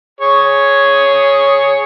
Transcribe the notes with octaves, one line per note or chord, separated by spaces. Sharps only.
G#4 C#5